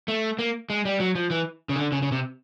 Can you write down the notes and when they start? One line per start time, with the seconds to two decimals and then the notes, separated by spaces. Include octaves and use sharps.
0.08 A3
0.39 A#3
0.70 G#3
0.85 G3
1.00 F#3
1.15 F3
1.30 E3
1.69 C#3
1.76 D3
1.92 C#3
2.02 C#3
2.12 C3